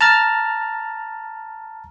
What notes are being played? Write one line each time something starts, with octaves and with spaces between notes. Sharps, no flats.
A5 A#5 F6 A6